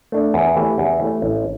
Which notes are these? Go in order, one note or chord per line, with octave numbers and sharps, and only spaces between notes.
A3 D4
E2
E3 A3 E4 G4
E2
E3 A3 E4 G4
A1